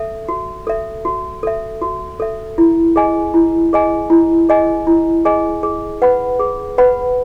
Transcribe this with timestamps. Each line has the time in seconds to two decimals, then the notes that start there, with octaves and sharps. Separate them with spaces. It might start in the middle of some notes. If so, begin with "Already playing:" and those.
Already playing: A4 E5
0.29 F#4
0.67 A4 E5
1.05 F#4
1.43 A4 E5
1.82 F#4
2.20 A4 E5
2.58 E4
2.96 G#4 D#5 G#5
3.34 E4
3.73 G#4 D#5 G#5
4.10 E4
4.49 G#4 D#5 G#5
4.87 E4
5.25 G#4 D#5 G#5
5.63 G#4
6.02 B4 F#5 B5
6.40 G#4
6.78 B4 F#5 B5